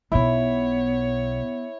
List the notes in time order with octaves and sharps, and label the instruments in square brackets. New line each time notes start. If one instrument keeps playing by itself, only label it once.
[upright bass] B1 B2 [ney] B3 [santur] E4 [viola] C#5